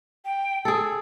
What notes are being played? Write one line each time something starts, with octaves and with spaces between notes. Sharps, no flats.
G5
G#4 A4 E6